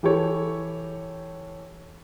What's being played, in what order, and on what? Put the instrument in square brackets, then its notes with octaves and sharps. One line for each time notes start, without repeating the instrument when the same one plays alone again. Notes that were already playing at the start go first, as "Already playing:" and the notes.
[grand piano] E3 G4 A4 C#5